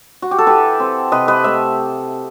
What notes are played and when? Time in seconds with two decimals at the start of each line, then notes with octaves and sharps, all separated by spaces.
0.22 F#4
0.31 G4
0.39 A4
0.47 E3 G4 B4
0.80 C4
1.12 C3 B4 D#5
1.28 B4 D#5
1.44 A3 E5